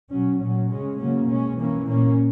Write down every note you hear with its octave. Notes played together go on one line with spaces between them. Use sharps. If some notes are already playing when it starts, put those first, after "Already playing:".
B2 F#3 C#4
A#2 F#3 C#4
C#3 G#3 C#4
C#3 F#3 A#3 C#4
B2 G#3 C#4
E3 A#3 C#4
A#2 A#3 C#4